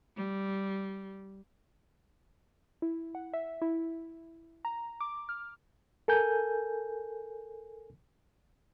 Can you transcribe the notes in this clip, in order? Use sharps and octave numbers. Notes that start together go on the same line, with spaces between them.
G3
E4
F#5
E5
E4
A#5
D6
F6
A4 A#4 G#5 G6